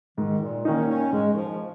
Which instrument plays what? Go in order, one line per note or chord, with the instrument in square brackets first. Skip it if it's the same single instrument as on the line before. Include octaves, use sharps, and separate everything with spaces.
[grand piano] G#2 [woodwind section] D#3
[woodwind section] A#2
[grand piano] D#3 A#3 D#4 [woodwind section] C#4
[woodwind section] C#4
[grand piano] G#2 [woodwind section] G#3
[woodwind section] D#3
F3